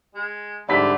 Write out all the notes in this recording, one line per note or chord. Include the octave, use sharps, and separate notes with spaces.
G#3
G#2 D3 G3 A3 D5 B5 B6